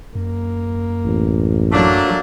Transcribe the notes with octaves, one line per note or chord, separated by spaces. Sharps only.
F#2 A#3
A1
F#3 A3 A#3 D4